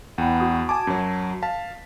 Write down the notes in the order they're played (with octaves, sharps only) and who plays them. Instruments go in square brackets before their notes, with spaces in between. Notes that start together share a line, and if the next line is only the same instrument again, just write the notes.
[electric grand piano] E2 [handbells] F#5 G5 B5
[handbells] F#4 D#6
[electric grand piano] G#5 D6 [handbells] A5 G#6
[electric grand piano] F#2 F#3
[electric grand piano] F5 A5 [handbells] B6